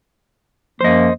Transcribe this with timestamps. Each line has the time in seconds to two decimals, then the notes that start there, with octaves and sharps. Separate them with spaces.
0.81 F#2 F3 A#3 C5 D#5